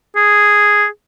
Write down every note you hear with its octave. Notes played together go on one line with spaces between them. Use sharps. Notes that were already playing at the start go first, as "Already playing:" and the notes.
G#4